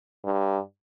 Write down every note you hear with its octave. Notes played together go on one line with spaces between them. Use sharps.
G2